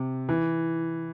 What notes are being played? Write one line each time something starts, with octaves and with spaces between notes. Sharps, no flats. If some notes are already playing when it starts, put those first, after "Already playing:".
Already playing: C3
E3